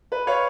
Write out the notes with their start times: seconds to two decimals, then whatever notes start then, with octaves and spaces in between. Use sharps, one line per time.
0.12 B4
0.27 C#5 F5